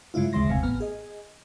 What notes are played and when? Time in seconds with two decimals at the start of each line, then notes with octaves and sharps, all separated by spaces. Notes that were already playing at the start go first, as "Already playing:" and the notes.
0.14 G2 C#3 G#3 E4 F4
0.33 D2 C#3 G#3 E5 C6 A#6
0.47 G1 D#2 C3 F5 G#5
0.63 A1 B3 F6
0.80 G#4 D#5